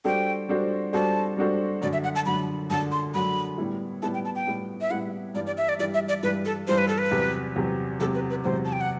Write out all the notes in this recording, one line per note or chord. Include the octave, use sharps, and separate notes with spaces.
G3 D4 F#4 A4 C5 G5
G3 D4 F#4 A4 C5
G3 D4 F#4 A4 C5 A5
G3 D4 F#4 A4 C5
F#2 D3 F#3 D5
E5
F#5
A5
F#2 D3 F#3 B5
F#2 D3 F#3 A5
C6
F#2 D3 F#3 B5
A2 G3 B3 E4
A2 G3 B3 E4 A5
G5
A5
G5
A2 G3 B3 E4
E5
A2 G3 B3 E4 F#5
G2 E3 G3 D5
D5
E5
D5
G2 E3 G3 D5
E5
D5
G2 E3 G3 B4
A4
G2 E3 G3 C5
B4
A4
B4
E2 C3 F#3
E2 C3 F#3
E2 C3 F#3 A4
B4
B4
E2 C3 F#3 C5
A5
G5
F#5